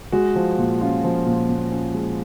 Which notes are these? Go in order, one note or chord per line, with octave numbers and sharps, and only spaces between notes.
G#3 F#4
F3
A#2
C#4 F4
F3
A#2
A#2
C#4
G#3